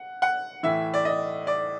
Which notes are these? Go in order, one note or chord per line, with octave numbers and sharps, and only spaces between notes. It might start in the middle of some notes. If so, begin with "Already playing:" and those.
Already playing: F#5
F#5
A2 E3 E5
D5
D#5
D5